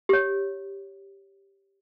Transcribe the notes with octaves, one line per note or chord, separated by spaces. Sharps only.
G4 C#5